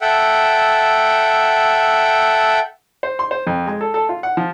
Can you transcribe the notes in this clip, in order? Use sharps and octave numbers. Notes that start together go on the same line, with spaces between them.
A4 E5 F#5 G5
C5
C6
C5
F2
G#3
A4
A4
F4
F#5
F3